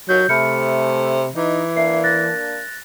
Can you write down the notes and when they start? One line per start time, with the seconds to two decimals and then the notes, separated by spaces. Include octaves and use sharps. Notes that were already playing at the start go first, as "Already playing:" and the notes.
0.09 D#2 F#3 G6
0.29 C3 A3 B5 F6 C#7
1.35 E3 D#4
1.77 A#3 D4 E5 C7
2.04 F#6 A6 A#6